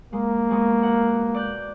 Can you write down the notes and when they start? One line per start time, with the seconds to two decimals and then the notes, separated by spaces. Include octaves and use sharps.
0.13 G#3 A#3
0.49 B2 G#3 B3
0.83 F#5
1.34 D5 F#6 G6